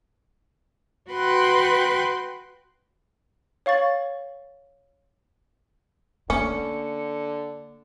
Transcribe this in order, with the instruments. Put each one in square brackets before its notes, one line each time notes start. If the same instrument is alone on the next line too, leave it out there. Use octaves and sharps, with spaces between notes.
[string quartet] F#4 B4 G5 B5 C6 F#6
[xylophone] C#5 F5 C#6 A6 F#7
[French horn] D3 [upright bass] A#3 [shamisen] C#4 [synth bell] C#7